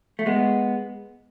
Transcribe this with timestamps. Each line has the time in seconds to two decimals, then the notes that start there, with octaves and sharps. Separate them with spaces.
0.19 A3
0.26 G#3 B3